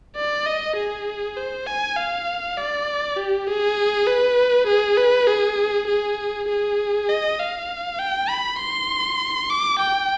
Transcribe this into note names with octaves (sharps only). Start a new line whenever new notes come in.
D5
D#5
G#4
C5
G#5
F5
D5
G4
G#4
B4
G#4
B4
G#4
G#4
G#4
D#5
F5
G5
B5
C6
D6
G5